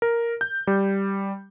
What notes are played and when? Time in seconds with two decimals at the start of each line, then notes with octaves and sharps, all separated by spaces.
0.02 A#4
0.41 G6
0.67 G3